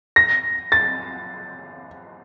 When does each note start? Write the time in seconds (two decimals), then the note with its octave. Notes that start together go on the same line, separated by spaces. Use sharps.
0.16 A#6
0.72 A6